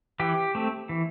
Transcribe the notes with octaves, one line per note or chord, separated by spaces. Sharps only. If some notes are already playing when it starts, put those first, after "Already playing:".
E3 G4
A3 C4
E3